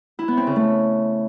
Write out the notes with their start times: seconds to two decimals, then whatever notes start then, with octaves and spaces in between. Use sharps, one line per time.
0.19 E4
0.28 B3
0.37 C4
0.47 C#3
0.56 A3